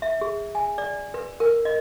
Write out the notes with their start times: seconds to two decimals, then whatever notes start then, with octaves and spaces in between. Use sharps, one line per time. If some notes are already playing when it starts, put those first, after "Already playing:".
0.02 E5
0.21 G#4
0.55 G#5
0.78 D5
1.14 B4
1.40 A#4
1.65 D#5